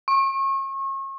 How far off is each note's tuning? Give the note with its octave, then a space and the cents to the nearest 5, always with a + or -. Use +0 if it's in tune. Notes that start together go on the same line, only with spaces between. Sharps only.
C#6 -35